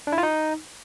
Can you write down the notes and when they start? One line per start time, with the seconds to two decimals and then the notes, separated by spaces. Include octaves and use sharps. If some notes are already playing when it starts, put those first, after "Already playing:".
0.07 D4
0.12 E4
0.18 F4
0.23 D#4